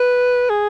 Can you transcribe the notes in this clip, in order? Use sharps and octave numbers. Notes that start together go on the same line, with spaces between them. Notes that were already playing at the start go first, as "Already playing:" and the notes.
Already playing: B4
G#4